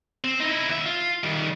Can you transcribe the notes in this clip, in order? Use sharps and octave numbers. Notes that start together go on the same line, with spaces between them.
C4
D#4 E4
D#2 E5
F4
D#3 G3